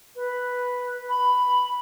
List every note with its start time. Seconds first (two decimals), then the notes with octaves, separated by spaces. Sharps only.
0.16 B4
1.09 B5